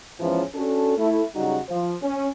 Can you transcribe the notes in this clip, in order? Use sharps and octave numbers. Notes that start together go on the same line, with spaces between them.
E2 G#2 E3 F3 C#4
C#4 D4 F#4 A4
A3 E4
C#3 F#3 G3 D#4 F#4
F3
C#4